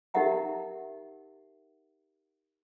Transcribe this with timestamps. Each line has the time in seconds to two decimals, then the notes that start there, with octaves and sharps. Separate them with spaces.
0.14 D#4 G4 A#4 E5 F#5 A#5